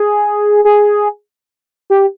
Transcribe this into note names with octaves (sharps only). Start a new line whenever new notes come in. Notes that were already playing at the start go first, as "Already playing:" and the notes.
Already playing: G#4
G#4
G4